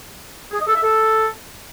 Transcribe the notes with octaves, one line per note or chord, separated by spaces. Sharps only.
G#4
D#5
A4
E5
A4